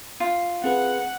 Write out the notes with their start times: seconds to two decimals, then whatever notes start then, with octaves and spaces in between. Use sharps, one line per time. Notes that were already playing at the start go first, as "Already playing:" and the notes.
0.20 F4
0.64 C4 G#4 B4 F#5